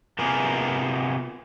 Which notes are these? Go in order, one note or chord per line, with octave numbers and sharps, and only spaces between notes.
C3 A#3 B3 F4 G#4 A#4